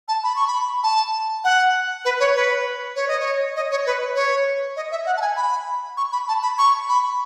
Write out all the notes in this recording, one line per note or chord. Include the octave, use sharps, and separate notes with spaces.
A5
B5
C#6
B5
A5
F#5
B4
C#5
B4
C#5
D#5
C#5
D#5
C#5
B4
C#5
D#5
E5
F#5
A5
G#5
B5
C#6
B5
A5
B5
C#6
B5